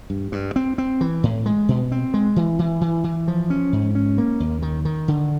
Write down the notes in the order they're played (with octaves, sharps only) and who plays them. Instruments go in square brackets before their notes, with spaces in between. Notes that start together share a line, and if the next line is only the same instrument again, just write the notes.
[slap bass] G2
G2
C4
C4
E3
A2
G#3
B2
C4
G#3
E3
E3
E3
E3
F3
C#4
G#2
C#4
A#3
D#2
D#3
D#3
D3